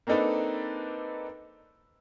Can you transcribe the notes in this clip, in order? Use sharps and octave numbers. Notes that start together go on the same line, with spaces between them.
A#3 C4 D4 D#4 A4 B4